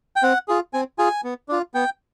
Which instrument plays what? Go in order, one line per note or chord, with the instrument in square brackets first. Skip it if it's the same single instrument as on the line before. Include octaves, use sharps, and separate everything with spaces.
[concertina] G5
C4 F#5
F4 G#4
C4 G#5
F4 G#4 G#5
B3
D4 F4
B3 G5